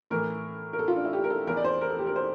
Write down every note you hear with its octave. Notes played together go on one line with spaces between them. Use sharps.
A2 E3 A#4
A#4
A4
F4
D4
E4
G4
A#4
A4
E2 E3 A#4
D5
C5
A#4
A4
G4
A#4
C5